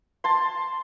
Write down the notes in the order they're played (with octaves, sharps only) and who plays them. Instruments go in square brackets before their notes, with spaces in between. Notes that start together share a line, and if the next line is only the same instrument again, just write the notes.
[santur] A5 C6